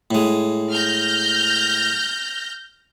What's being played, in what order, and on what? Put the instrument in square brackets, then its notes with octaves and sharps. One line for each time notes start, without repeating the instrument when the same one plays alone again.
[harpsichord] A2 G#3
[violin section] F6 G6 A#6